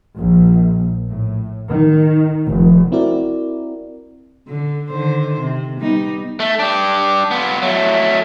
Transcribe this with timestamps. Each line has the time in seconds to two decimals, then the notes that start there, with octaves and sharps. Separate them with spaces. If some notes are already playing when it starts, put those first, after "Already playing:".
0.16 A#1
1.08 A2
1.69 D#3
2.45 F1
2.92 C4 E4 F#4 A#4 D5
4.48 D3
4.90 D3 D#3 C5
5.40 C3
5.79 G3 B3 D#4
6.40 A3
6.59 D4 G4
7.31 B3 F4
7.62 F#3 A3